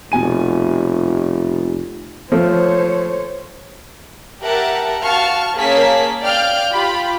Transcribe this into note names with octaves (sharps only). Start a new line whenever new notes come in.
F1 B2 G#5 D#7
F3 A3 C5 C#5
G4 A#4 E5 F#5 A5
F#4 F5 A5 C#6 F6
A#3 C#4 G#4 C#5 A5 B6
D5 F5 G5 F6 G6
F4 G4 B5